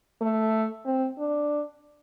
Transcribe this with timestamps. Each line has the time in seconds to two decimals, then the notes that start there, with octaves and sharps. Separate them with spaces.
0.21 A3
0.85 C4
1.18 D4